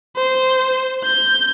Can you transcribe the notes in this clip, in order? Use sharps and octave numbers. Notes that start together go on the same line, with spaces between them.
C5
G6